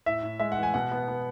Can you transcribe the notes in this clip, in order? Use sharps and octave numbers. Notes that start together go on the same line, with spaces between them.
A2 E5
A2
G#3 E5
E3 F#5
G#5
B2 F#5
B3
B3